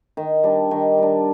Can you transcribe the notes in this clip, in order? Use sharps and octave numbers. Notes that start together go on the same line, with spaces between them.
D#3
G3 D4
D#3
G3 D4